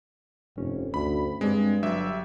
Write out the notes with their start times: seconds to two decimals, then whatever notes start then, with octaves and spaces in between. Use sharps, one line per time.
0.57 F1 G2 C#4
0.94 D2 B5
1.41 G2 G#3 C4 D4 G#4
1.82 G1 F#3 E5